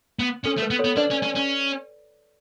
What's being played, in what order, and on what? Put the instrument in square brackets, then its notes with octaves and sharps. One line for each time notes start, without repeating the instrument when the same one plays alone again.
[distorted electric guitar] B3
[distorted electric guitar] C#4 [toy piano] A4
[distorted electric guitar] A3
[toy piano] B4
[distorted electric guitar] B3
[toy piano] A4 C#5
[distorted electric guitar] B3
[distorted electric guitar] D4 [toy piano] B4 D5
[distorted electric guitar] C#4
C#4
C#4